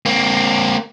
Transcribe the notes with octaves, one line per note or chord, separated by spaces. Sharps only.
A#3 C4